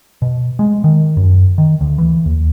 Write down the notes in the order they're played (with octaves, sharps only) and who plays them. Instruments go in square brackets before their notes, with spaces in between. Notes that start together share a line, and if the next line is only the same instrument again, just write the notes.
[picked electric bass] B2
G#3
D#3
F#2
D#3
D2
E3
D#2